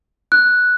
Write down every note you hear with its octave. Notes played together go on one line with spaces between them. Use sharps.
F#6